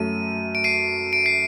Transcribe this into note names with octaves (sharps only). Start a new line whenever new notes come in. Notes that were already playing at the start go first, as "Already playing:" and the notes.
Already playing: F#2 F#3 A3 D#7
D7
C7 D#7
D7
C7